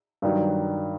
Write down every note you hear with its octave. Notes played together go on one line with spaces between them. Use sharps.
G2 D#3 F#3